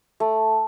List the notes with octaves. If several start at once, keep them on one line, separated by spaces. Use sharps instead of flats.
A3